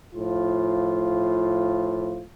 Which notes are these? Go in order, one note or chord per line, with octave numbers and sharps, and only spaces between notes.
A2 F3 F4